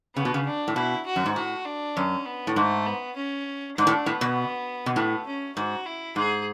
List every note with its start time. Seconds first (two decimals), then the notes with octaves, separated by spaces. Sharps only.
0.15 C#3 B3
0.25 B2
0.34 C#3
0.46 D4
0.68 A2
0.76 B2 E4
1.06 F#4
1.16 F#2
1.26 G#2
1.36 A2 F#4
1.66 D4
1.96 F#2 C#4
2.26 B3
2.47 A2
2.56 G#2 A3
2.86 B3
3.16 C#4
3.77 G#2 D4
3.87 A2
4.06 A2 B3
4.21 B2
4.86 B2
4.96 A2 B3
5.27 C#4
5.57 G#2 F#4
5.86 E4
6.16 G#2 G#4